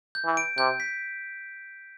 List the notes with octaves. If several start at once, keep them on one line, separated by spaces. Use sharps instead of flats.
G6
E3
D7
C3 G6
B6